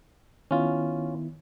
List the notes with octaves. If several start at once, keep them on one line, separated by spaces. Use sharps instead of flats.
D#3 B3 C#4 E4 F4